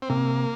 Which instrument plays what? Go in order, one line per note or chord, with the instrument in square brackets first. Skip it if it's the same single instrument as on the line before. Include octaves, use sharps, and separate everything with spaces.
[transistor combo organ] C4
[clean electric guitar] C3 [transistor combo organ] A#3